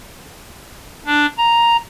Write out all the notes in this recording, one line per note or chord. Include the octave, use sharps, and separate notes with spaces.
D4
A#5